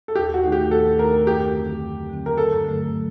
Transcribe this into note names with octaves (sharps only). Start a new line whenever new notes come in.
A4
D#2 G4
F#4
D#3 A3 D#4
G4
D#2 A4
D#3 A3 D#4 A#4
F#2 G4
D3 F#3 C4
F#2
D3 F#3 C4
A#4
G2 A4
D3 F#3 A3